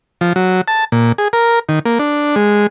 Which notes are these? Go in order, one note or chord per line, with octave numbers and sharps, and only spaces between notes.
F3
F#3
A5
A#2
G#4
A#4
D#3
A#3
D4
G#3